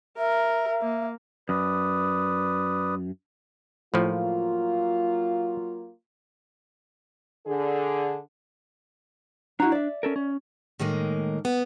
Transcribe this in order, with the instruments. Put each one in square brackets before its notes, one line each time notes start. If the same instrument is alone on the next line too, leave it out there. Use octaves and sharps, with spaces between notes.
[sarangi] A#4 [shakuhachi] E5
[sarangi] A#3
[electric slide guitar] F#2 [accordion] B4 D5 D#6
[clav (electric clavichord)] A2 F3 [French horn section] F#3 A#3 F4
[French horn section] D3 G#4
[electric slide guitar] D4 [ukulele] E4 F#4 A#5
[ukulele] D5 E5
[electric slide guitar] C#4 A4 A#4
C#4
[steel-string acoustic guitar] A2 D#3 G#3 A#3
B3